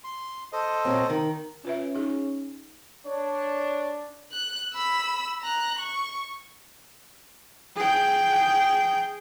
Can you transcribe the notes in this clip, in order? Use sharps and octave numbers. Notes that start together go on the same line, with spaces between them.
C6
A4 C5 D#5
A#2 F#3 C4
D#3
C#4 F4 B4 E5
D#4 G#4
D4 C#5
F#6
B5 E6
A#5 F#6
C#6
G#4 G5